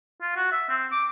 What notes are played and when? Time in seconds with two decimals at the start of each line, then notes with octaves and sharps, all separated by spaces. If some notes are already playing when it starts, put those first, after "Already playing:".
0.22 F4
0.36 F#4
0.52 E5
0.69 C4
0.92 D6